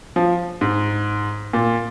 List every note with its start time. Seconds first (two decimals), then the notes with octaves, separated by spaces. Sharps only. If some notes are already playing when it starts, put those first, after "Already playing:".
0.16 F3
0.61 G#2
1.53 A#2